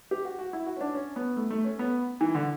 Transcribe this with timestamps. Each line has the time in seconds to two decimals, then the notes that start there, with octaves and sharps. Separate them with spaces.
0.11 G4
0.25 F#4
0.39 F#4
0.53 E4
0.67 F#4
0.76 C#4
0.81 D4
0.95 C#4
1.16 B3
1.37 A3
1.50 A3
1.64 C#4
1.79 B3
2.21 E3
2.35 D3